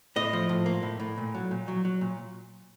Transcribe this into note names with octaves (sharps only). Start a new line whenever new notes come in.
A2 D#5
F3
A2
A#3
A2
A2
A#2
F#3
A#2
F#3
F#3
A#2